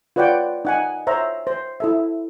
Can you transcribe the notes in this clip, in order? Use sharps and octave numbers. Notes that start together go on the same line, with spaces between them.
F4 B4 C#5 D5 F#5 G5
D#4 F#5 G#5
C5 C#5 E5 A#5
C5
E4 A4 E5